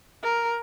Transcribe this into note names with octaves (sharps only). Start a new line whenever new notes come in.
A#4